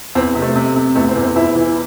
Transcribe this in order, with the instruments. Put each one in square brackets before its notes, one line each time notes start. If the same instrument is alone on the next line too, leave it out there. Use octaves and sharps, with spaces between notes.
[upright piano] E2 C4
C3
A3
C3
C3
E2 A3
C4
E2
C4
E2 E4
E3